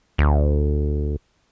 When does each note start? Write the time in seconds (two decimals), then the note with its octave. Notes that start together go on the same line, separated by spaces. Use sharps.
0.18 D2